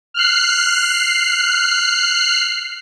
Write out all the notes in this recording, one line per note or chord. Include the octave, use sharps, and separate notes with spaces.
F6 F#6 C7